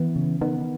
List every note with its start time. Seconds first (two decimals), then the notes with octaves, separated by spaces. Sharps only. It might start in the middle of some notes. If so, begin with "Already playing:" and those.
Already playing: E3 B3
0.16 C#3
0.41 D#3 B3